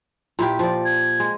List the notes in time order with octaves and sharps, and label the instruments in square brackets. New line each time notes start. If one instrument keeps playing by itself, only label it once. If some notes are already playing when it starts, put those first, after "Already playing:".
[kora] A#2 E4 G4
F3 D5
[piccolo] G#6
[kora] G#3